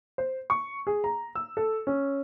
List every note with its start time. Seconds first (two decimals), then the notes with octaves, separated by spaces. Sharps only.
0.18 C5
0.50 C#6
0.87 G#4
1.04 A#5
1.35 E6
1.57 A4
1.87 C#4